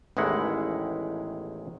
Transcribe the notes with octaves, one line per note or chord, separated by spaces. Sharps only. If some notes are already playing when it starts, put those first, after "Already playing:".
A1 E2 D#3 G#3 E4 F#5